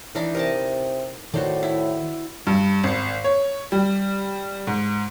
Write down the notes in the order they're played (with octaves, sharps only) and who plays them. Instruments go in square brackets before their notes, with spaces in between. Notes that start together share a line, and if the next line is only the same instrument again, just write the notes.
[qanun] E3 D4 D#4
[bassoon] C3 [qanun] A#4 D#5 A5
[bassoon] A2 [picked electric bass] D#3 [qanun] F#4 C5 D5
[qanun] E4
[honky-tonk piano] G2
G#1
C#5
G3
G#2